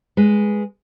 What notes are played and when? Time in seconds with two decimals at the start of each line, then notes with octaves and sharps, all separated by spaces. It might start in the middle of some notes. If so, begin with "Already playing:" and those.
0.17 G#3 B4